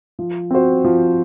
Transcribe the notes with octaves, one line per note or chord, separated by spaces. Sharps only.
F3
C4 F#4 C5
F3